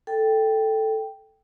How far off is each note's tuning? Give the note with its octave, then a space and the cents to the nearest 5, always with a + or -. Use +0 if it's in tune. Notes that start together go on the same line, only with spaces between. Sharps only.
A4 +0 G5 +0